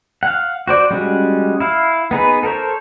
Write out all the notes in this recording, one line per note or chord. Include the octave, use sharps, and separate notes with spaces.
F5 F#5
F#4 C5 D5
G3 G#3 C#4 F#4
E4 F5
B3 D#4 G#4 B4
A4 A#4 C5 C#5